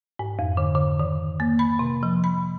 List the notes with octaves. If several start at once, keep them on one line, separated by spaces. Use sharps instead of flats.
G#2
F2
D3
D3
D#3
A#3
B5
C3
F3
B5